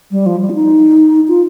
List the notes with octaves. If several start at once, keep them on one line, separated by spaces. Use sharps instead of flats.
G3
F3
G3
F4
D#4
F4